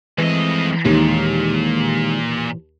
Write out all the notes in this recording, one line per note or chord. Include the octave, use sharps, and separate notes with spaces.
F2 E3 G#3 A3 C4 D#5
D#2 A#2 D#3 G#3